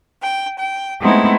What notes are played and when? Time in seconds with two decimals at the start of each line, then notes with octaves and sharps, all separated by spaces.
0.22 G5
0.58 G5
1.00 G#3 A3 B3 C4 D#4 E4